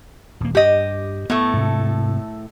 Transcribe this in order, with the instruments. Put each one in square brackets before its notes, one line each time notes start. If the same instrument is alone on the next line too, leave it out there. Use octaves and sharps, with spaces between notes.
[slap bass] D#1 A#3
[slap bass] G2 [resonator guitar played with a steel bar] G4 D#5
[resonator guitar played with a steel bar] A2 A3 [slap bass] B3
[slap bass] G#2 C3